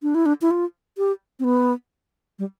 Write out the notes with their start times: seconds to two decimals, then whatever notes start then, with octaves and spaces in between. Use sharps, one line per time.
0.03 D4
0.15 E4
0.26 D4
0.42 E4
0.51 F4
0.98 G4
1.39 C4
1.44 B3
2.39 G3